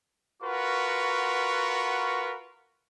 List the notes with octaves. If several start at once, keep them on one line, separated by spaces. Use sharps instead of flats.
F4 F#4 A#4 B4 F#5 C#6